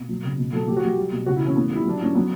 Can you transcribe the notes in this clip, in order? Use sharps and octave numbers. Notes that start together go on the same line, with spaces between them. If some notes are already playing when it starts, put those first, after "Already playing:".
Already playing: B2
F#3
C#3
B2
F#3 A4
F#3 G4
F#4
F#3 G4
G3
B2
C#3 F#4
E4
E3 C#4
A2 B3
G3 E4
F#3 D4
A2 C#4
F#3 B3